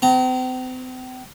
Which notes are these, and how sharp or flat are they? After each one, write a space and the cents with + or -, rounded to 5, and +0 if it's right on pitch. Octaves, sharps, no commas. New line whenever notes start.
C4 -40 A#5 -10